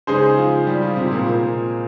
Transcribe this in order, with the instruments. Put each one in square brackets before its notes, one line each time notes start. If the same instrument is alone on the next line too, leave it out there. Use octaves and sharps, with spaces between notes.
[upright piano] C#3 C#4 [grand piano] G#3 D#4 G#4 C5
[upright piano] F3 F4
G3 G4
F3 F4
C3 C4
C4
A#2 A#3
A#2 A#3